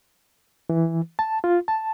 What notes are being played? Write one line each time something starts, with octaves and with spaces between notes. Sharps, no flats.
E3
A5
F4
A5